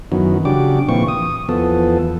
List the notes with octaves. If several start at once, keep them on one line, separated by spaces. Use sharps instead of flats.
F#2 D#3 E3 F#3 B3
C#3 D4 F#4 G4 D6
A#2 E3 F3 C4 C#6
D#6
E2 F3 B3 A4